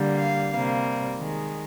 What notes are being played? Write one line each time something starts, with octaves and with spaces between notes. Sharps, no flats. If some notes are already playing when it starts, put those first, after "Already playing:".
Already playing: D3 G3 A#3
F5
C3 G3 A#3
D#3 G#3